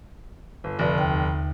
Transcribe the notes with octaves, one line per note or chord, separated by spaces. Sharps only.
G1
F1 D3 D5
D#2 G5